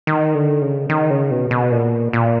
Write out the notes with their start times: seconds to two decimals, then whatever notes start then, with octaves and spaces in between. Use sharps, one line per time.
0.07 D#3
0.35 D3
0.61 C#3
0.89 D#3
1.11 C#3
1.31 B2
1.51 B2
1.72 A#2
2.13 A#2